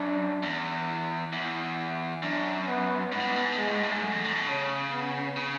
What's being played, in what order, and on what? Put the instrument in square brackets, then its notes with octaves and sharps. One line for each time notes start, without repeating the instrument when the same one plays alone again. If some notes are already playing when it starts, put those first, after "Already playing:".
Already playing: [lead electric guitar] F#2 [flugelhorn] D4
[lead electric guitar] E2
[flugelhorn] E4
[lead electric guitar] E2 [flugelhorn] E4
[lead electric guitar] F#2 [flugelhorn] D4
[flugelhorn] B3
[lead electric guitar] G#2 [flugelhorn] B3
[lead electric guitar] A2
G#2
A2
G#2
A2
[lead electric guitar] G#2 [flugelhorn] G#3
[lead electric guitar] A2
G#2
A2
G#2
[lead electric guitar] F#2 [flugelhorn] A3
[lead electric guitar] E2
F#2
B2
[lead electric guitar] C#3 [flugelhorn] C#4
[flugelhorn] B3
[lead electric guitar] C#3